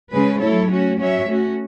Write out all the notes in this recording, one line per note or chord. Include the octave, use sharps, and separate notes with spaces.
C#3 G#3 C#4 G#4 B4
F#3 A3 E4 A4 C#5
A3 C#4 F#4
F#3 C#4 F#4 C#5 E5
A3 C#4 F#4